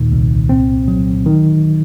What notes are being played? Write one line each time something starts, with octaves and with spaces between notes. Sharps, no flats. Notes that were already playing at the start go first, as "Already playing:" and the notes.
Already playing: D#2 A#2 D#3
C2
C4
F#3
D#3